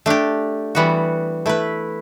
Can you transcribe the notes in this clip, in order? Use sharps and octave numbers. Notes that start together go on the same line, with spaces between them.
A3 D4 G4
E3 G3 B3 F#4
A3 E4 B4